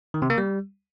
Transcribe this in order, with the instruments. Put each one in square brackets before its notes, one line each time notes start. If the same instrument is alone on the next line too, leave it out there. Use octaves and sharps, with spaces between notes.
[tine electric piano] D#3
C3
A#3
G3